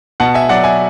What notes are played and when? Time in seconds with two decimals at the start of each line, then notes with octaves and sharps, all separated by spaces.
0.20 B2 F#5 A5
0.34 E5 G#5
0.49 F#3 D5 F#5
0.64 E5 G#5